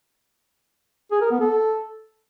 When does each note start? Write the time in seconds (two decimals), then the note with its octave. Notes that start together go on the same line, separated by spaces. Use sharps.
1.12 G#4
1.21 A#4
1.31 B3
1.40 A4